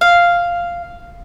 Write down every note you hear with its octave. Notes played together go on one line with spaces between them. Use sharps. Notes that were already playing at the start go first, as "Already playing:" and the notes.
F5